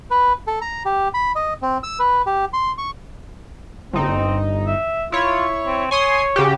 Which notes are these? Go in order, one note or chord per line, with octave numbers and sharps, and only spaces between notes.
B4
A4
A#5
G4
B5
D#5
C4
E6
B4
G4
C6
C#6
G1 C4 D#4
E5
E4 F4 C#5
C4
C#5 G#5 C6 D#6
C#3 F#4 G4